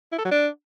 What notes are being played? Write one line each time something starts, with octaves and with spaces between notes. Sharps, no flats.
E4
A4
F#3
D4